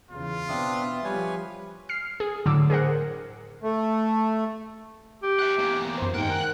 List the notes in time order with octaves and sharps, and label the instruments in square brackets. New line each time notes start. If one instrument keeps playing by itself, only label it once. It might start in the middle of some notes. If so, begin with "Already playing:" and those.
[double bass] E2 C#3 [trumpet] F4
[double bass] B2 B3 [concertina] C4 D4 D#6 [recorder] E5
[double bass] F3 G3 [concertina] B4 C#5 G#5
[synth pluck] F6 C7
G#4
A2 D3 F#3 D6 E6
G#4 A#4 C5 F#5
[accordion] A3
[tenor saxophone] G4
[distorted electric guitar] E5 F#5
E2 A#3
[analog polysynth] F#2 C5
[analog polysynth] G#2 D#3 [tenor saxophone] A#4 [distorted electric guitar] F#5 G5
[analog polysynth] F#6